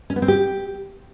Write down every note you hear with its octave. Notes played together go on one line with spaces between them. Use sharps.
C#4
B3
C4
G4